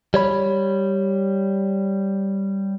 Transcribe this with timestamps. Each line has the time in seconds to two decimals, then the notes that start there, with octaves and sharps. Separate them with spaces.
0.14 G3 C#5 B5